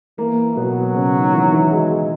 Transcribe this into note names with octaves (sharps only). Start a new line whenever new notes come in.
E3 A#3
B2 F#3 B3
C#3 C#4
D#3 D#4
E3 E4
E3 E4
G#3